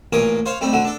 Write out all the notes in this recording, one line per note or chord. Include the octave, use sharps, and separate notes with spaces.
A1 A#2 A#4 C#5 D6 D#6
C5 C#5 F5 C6
G3 A3 C4 D#4
D3 A3 F#4
D4 A4